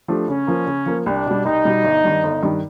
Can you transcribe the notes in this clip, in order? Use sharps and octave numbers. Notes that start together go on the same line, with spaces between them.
F3 A3 D4 G4
C#3 C#4
F3 A#3
C#3
F3 A#3
C2 D4
B2 G3
C2 D#4
B2 G3
G1
G2 D#3
G1
G2 D#3